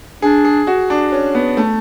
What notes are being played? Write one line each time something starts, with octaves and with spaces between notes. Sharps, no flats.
D4 G#4
G#4
F#4
D4
C#4
B3
A3 D4